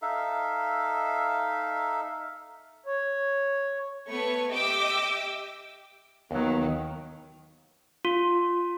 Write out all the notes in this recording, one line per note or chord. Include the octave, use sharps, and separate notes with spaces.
D#4 A4 E5 F5
C#5
A3 B3 B4 C#5 C#6
G4 D#5 E5 G5 D6 E6
D#2 D#3 F#3 B3
F4